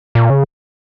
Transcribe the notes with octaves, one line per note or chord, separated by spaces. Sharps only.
A#2
C#3